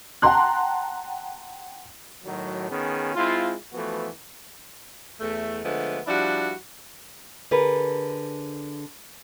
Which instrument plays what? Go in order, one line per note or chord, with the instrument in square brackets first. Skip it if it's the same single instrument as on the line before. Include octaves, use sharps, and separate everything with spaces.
[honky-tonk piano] F#5 G5 A5 A#5 C6 F#6
[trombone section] A2 D#3 F#3
D#3 B3 C#4 G#4
G#3 C4 E4 F4
E3 F3 A3 B3 F#4
[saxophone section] E2 A3
D3 F3 G#3 A3 B3
F3 G3 D4 E4 F#4
[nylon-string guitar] D3 G#4 A#4 B4